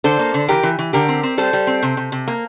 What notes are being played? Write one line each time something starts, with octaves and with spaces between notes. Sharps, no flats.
D3 A4 C5
A#3
D3
E3 G4 A#4
E3
E3
D3 G4 A#4
C4
C4
G3 A4 C5
G3
C4
C3
C3
C3
A#3